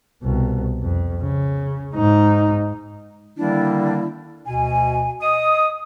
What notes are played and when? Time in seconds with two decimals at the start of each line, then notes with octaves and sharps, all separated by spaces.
0.23 C2 B2
0.83 F2
1.22 C#3
1.95 G#2 D#4
3.37 D3 D#3 G3 A#3 D4 E4
4.47 D2 B2 G#5
5.21 D#5 D#6